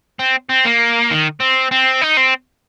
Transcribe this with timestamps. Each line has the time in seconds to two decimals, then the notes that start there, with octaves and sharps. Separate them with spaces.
0.19 C4
0.49 C4
0.65 A#3
1.11 D#3
1.40 C4
1.71 C4
2.01 D#4
2.17 C4